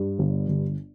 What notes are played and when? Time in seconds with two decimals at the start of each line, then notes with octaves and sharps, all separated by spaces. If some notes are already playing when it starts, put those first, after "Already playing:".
Already playing: G2
0.19 G1
0.48 G1